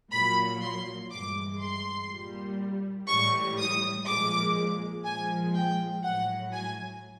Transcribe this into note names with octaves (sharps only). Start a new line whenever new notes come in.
A#2 F#3 B5
C6
G2 E3 G#3 D6
C6
A#2 G3
A2 E3 G3 C#6
D#6
A#2 F3 G#3 D6
A#2 F3 G#3 G#5
G5
A2 F#3 F#5
G#5